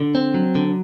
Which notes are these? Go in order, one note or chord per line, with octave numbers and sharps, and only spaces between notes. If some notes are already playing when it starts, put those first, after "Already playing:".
Already playing: D3
C4
F#3
D3